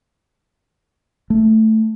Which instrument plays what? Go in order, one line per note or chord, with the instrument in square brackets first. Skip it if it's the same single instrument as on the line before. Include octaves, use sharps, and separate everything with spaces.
[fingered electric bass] A3